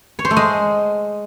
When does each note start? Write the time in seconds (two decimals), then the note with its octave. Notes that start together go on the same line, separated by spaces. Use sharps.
0.19 C#5
0.25 C5
0.31 A3
0.37 G#3